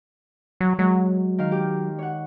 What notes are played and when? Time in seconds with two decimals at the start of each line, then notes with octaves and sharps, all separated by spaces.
0.61 F#3
0.79 F#3 G#3
1.38 D#3 F5
1.52 G4
1.99 C#5 F#5